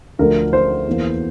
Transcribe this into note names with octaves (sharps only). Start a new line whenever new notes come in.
D2 D3 F3 A3 A#4
C5
E2 E3 A#3